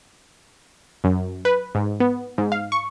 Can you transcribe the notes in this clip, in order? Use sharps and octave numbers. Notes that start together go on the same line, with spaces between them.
F#2
B4
G#2
B3
G#2
F5
C#6